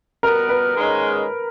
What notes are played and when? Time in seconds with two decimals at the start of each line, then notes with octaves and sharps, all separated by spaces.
0.23 B2 G3 B3 A#4
0.49 B4
0.75 G#2 D#3 G#3 C#4